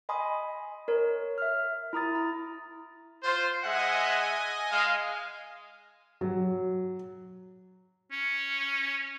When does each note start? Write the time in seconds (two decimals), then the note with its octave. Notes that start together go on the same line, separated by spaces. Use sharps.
0.09 D#5 G#5 B5 C6 D#6
0.88 A#4 C#5
1.38 E5 F6
1.93 E4 A#5 D#6 A6
2.15 A#5
3.23 F4 C5
3.63 G#3 D#5 E5 F#5 G#5
4.71 G#3 F5
6.21 F#3
8.12 C#4